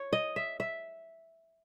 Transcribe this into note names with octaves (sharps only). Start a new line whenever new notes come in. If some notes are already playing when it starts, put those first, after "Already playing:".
Already playing: C#5
D#5
E5
E5